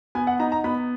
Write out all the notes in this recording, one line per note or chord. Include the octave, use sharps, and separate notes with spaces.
B3 G#5
F#5
D#4 A#5
A#5
B3 B5